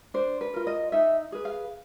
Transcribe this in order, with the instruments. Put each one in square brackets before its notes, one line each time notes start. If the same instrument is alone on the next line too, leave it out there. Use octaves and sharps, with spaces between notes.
[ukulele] D4 C5
B4
F4 A#4
D#5
D#4 E5
G#4 B4
F5